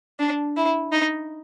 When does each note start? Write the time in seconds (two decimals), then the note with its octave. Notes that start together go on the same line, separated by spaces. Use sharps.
0.19 D4
0.57 E4
0.92 D#4